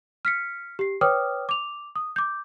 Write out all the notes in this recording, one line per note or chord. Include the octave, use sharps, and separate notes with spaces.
F6 B6 C#7
G4 C7
B4 C#5 G5 D6 D#6 F6
D6 F7
D#6
D6 G6